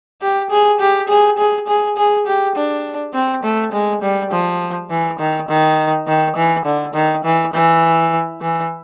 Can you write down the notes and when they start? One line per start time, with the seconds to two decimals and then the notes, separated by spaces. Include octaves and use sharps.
0.21 G4
0.50 G#4
0.80 G4
1.09 G#4
1.38 G#4
1.67 G#4
1.97 G#4
2.26 G4
2.56 D4
3.14 C4
3.43 A3
3.72 G#3
4.02 G3
4.31 F3
4.90 E3
5.19 D#3
5.48 D#3
6.07 D#3
6.36 E3
6.65 D3
6.94 D#3
7.24 E3
7.53 E3
8.41 E3